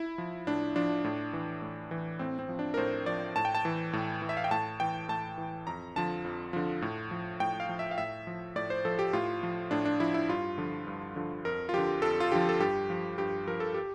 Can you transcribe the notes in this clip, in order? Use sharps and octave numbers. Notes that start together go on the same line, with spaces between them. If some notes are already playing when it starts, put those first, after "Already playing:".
Already playing: E4
F3
A2 D4
F3 D4
A2
E3
A2
E3
A2 C4
C4
F3
D4
A#4
A2 C5
F3 D5
A2 A5
G5
A5
E3
A2
E3
E5
F5
G5
A2 A5
E3 G5
A2 A5
E3
F2 A#5
D3 F3 A5
F2
D3 F3
A2
F3
A2 G5
F5
F3
E5
F5
A2 E5
F3
A2 D5
C5
F3 A4
G4
A2 F4
F3
A2 D4
D4
F3 E4
E4
G2 F4
D3 F3
G2
D3 F3
F2 A#4
F4
D3 F3 G4
F2 A4
F4
D3 F3 G4
A4
G2 G4
F3
G2 G4
F3 A#4
A4
G4